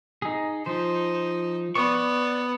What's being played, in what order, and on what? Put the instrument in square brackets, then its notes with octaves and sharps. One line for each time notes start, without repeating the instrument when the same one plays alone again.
[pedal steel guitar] D#4 G#4
[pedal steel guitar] F3 C5 [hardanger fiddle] D#4
[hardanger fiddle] B3 [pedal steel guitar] D5 C#6